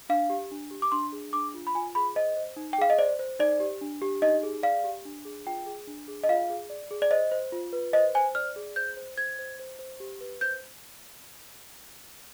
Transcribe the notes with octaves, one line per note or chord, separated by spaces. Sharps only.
D4 F5
G4
D4
G4
D6
D4 C6
G#4
D4 D6
F4
B5
F4 G#5
G#4 B5
C5 D#5
C5
D#4
G5
G#4 F5
D#5
C5 D5
C5
D#4 D5
G4
D4
G4
D#4 D#5
G#4
D5 F5
G4
D4
G#4
F4 G5
G#4
D4
G#4
D#5
F4 F5
G#4
D5
G#4
D5
C5 D#5
C5
F4
B4
C5 D#5
C5 G#5
D5 F6
G#4
C5 G6
C5
C5 G#6
C5
C5
C5
G4
B4
C5 G6